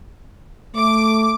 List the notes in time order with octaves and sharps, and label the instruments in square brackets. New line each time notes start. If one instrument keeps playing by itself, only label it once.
[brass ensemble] A3 [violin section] D6